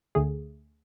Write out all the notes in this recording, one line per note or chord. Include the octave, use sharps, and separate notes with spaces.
D2 D3 A3 G#4